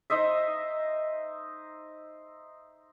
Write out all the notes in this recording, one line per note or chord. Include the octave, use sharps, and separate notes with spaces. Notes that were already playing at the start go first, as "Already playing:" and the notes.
D#4 C5 D#5 E5